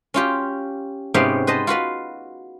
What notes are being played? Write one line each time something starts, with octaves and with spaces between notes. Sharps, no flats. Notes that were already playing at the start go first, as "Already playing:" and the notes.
C#4 F4 G4
G#2 C3 B3 C#4 G4 F5
B4 C5 D#5 A5
F4 F#4 B4 F5